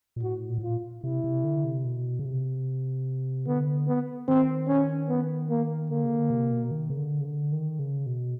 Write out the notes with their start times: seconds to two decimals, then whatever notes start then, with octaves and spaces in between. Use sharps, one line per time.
0.16 A#2
0.23 A2 F#4
0.49 A#2
0.58 A2
0.63 A#2 F4
1.04 C3 E4
1.24 C3
1.44 D3
1.64 C3
1.85 B2
2.19 C#3
2.25 C3
3.47 D3 B3
3.88 B3
4.28 D#3 C4
4.68 C#4
5.09 B3
5.49 A#3
5.90 D3 A#3
6.04 C#3
6.10 D3
6.30 C3
6.51 B2
6.71 D#3
6.90 C#3
6.98 D3
7.21 C#3
7.25 D3
7.52 D#3
7.79 C#3
8.06 B2